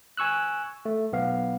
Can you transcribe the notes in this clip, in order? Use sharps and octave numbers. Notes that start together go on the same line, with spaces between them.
G#5 C#6 E6 F#6
A3
B1 B3 F5